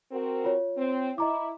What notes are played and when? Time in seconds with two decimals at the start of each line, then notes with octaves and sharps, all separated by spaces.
0.12 C4 F#4 A#4
0.44 F4 C#5
0.77 C4
1.18 E4 D#5 A#5 D6